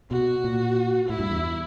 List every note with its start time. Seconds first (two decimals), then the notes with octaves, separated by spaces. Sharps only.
0.11 B2 F#4
0.44 A#2
1.09 A2 E4
1.20 G2
1.31 E2